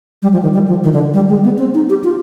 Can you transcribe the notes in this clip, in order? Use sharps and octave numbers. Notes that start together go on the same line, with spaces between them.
G3
F3
D#3
G3
F3
D#3
D3
G3
G#3
B3
C4
D#4
G4
F4